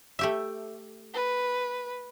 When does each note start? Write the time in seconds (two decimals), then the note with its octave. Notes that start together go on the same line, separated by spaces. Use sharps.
0.19 A3 G4 E5
1.14 B4